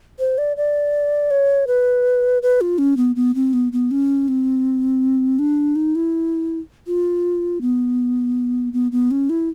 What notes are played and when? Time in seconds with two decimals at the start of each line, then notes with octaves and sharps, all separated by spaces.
0.19 C5
0.38 D5
0.57 D5
1.31 C#5
1.67 B4
2.42 B4
2.61 F4
2.78 C#4
2.97 B3
3.16 B3
3.35 C4
3.53 B3
3.72 B3
3.91 C#4
4.28 C4
5.39 D4
5.76 D#4
5.95 E4
6.87 F4
7.61 B3
8.73 B3
8.92 B3
9.11 C#4
9.30 E4